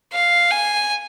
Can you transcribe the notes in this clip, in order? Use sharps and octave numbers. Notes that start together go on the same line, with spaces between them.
F5
G#5